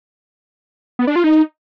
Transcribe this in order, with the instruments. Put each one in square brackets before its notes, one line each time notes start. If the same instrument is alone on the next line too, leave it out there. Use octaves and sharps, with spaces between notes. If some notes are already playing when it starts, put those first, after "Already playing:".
[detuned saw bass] B3
D4
F4
D#4